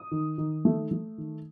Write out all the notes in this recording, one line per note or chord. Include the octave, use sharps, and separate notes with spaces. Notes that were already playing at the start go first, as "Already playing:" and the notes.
Already playing: D#6
D#3
D#3
A3
A3
D#3